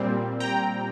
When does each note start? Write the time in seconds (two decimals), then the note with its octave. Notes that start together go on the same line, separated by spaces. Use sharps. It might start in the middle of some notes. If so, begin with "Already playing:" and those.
Already playing: A#2 G3 C4
0.40 G5 A#5